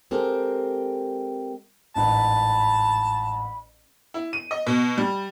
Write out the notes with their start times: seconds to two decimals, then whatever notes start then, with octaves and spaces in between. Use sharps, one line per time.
0.11 G#3 C4 G4 A4 A#4
1.96 A1 G#2 A5 B5
4.14 E4
4.33 D#7
4.51 D#5
4.67 B2
4.98 G3